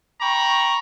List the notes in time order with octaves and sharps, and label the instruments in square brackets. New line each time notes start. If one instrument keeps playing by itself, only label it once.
[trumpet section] G5 A#5 B5 C#6